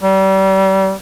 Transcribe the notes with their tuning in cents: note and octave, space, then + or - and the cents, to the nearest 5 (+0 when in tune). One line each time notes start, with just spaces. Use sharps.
G3 -30